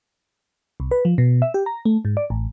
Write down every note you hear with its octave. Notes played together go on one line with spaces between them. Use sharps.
C2
B4
F3
B2
E5
G4
A#5
A3
G#2
D5
A1